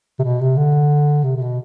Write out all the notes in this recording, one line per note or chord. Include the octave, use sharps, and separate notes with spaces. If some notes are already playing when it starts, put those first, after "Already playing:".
C3
B2
C3
D3
C3
C3
B2